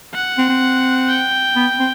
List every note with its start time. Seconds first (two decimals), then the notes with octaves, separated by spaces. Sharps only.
0.14 F#5
0.38 C4
0.49 C4
1.09 G5
1.56 B3
1.79 C4